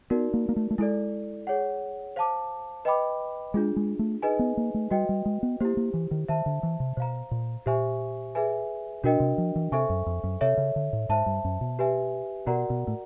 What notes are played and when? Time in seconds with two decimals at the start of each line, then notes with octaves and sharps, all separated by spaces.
0.10 B3 D#4 F#4 A#4 D5
0.34 A#3
0.49 A#3
0.56 A3
0.71 A3
0.78 G#3 E4 A4 D5
1.47 G#4 C#5 F#5
2.16 C5 F5 A5 D6
2.85 B4 D#5 G5 B5 D6
3.54 G#3 D4 F4 G#4
3.76 G#3
3.99 A3
4.22 D#4 G#4 B4 D#5 G#5
4.39 B3
4.57 A#3
4.74 A3
4.91 G3 F#4 B4 D#5 G5
5.09 G3
5.26 G#3
5.43 B3
5.60 A#3 E4 G4 C5
5.77 A#3
5.94 E3
6.11 D#3
6.29 D#3 C5 E5 A5
6.46 D3
6.63 E3
6.80 C3
6.97 B2 C5 F5 A#5
7.31 A#2
7.66 A#2 G4 C5 E5 G#5 C#6
8.35 G#4 B4 E5 G#5
9.04 B2 D4 F#4 A#4 D#5 G5
9.20 C3
9.38 F3
9.56 E3
9.72 C3 A4 C5 E5 G#5 C#6
9.90 F#2
10.06 F2
10.24 F#2
10.41 C3 A4 C#5 E5
10.57 C#3
10.76 D3
10.93 A2
11.09 G#2 C5 E5 A5
11.26 G2
11.45 F#2
11.61 B2
11.79 G4 B4 E5 G#5
12.47 B2 F#4 A#4 D5 F#5 A#5
12.70 B2
12.88 A2